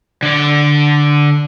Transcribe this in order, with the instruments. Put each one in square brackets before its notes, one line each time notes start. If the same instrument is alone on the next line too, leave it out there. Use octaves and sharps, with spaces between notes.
[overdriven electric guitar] D3 D5